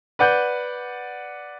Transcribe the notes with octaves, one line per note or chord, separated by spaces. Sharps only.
B4 D5 F#5 G6